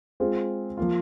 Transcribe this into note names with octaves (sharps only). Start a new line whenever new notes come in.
G#3 C4 F4 G#4
F3 A#3 F4